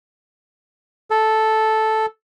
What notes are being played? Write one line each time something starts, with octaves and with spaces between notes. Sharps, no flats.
A4